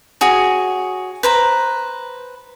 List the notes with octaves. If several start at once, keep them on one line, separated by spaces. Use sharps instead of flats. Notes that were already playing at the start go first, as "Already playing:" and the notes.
F#4 G#4 C#5
B4 C5 A#5